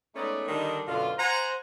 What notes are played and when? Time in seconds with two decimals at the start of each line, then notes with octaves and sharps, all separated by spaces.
0.15 G#3 A3 B3 C#4 D#4 D5
0.48 D3 D#3 G3 D4 D#4
0.87 F#2 B2 D3 F4
1.18 C5 F#5 G#5 A#5